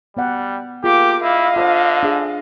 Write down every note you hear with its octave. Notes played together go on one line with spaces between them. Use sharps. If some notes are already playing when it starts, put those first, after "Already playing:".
G3 B3 D5 F#5
A#3 F4 G4 G#4 D6
E4 D#5 F5
D3 F4 C5 D5
D4 G#4